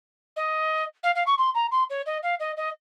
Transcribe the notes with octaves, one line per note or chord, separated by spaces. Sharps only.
D#5
F5
F5
C#6
C6
A#5
C6
C#5
D#5
F5
D#5
D#5